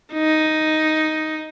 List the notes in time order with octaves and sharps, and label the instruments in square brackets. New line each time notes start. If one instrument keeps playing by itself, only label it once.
[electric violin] D#4